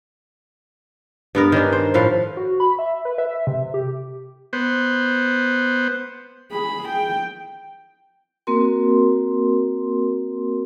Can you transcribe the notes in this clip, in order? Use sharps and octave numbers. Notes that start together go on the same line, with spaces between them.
G2 B3 A#4
D#3 C#4 D4
C5
A2 F3 B4 F5
F#4
B5
E5
B4
E5
C3
G4
B3 C5
G#4 B5
G5
A#3 C4 F#4 A#4 C6